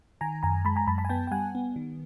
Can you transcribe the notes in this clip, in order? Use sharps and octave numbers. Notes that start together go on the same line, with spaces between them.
D#3 G#5 A#5
F#2 G#5 A#5
G#3 A5 B5
G#5 A#5
F#2 A5 B5
A5 B5
G#5
B3 G5 A5
G5
G3 F#5 G#5
B3
D#3